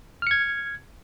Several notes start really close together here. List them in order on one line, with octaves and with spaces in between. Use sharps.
F6 C#7 G#6